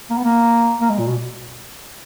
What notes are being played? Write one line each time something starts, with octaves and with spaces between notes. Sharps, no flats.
A#3
B3
A#3
A#3
G#3
A#2
B2